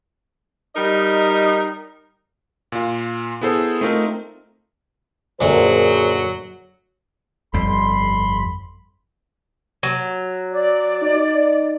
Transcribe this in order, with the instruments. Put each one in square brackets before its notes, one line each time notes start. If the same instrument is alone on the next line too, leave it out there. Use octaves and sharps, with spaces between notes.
[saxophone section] G3 D#4 A#4 D#5
[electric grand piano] A#2 F4
B3 E4 G#4 A4 C5
A3 C4 D#4 F4 A#4
[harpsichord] F#2 A#2 D3 [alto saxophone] F#3 [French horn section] G#4 A#4 C5
[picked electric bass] G1 F2 G3 [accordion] B5 C6
[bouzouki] F#3
[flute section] D5
[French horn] D#4